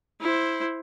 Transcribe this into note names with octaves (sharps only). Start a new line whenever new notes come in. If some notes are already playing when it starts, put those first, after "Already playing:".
E4 C5